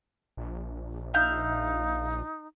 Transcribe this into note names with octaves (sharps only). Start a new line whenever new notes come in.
A#1
D#4 E5 F5 G6